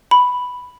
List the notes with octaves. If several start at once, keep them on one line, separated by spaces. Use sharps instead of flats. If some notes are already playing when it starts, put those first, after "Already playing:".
B5